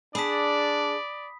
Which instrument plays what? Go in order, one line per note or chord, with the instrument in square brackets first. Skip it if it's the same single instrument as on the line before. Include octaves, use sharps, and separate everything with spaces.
[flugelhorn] D4 [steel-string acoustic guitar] G#4 A5 [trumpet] D5 [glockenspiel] B5 D#6 B6